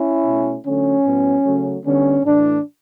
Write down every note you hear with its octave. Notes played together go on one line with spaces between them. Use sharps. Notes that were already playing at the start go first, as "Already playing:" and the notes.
Already playing: C#4 E4
B2 A3
D3 F#3 A3 C#4
A2 F#3 B3
C#3 F#3 A3
D3 G3 B3 C#4
A2 E3 A3 D4